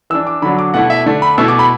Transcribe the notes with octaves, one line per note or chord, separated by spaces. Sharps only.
E3 D4 E6
D6
D3 F#3 D4 B5
D6
B2 A3 E4 F#5
E5
D3 A3 D4
B5
B2 A3 E4 E6
D6
B5